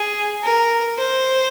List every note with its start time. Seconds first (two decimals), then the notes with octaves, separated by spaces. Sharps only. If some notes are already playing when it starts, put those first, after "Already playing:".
Already playing: G#4
0.43 A#4
0.98 C5